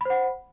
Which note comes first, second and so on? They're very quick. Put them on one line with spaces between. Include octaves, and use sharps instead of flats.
B5 C5 F#5